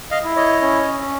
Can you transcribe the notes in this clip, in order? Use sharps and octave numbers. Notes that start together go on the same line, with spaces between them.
D#5 F5
E4
C#5 D#5
C#4
C#4